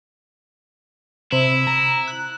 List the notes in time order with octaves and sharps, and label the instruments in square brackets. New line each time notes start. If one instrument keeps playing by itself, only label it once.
[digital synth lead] C3 [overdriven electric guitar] E4
[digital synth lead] A#5
F#6